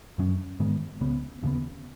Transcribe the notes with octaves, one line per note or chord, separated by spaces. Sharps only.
F#2 F#3 C#4
G#2 D#3 G#3 B3
C#2 C#3 B3
D#2 C#3 G#3 B3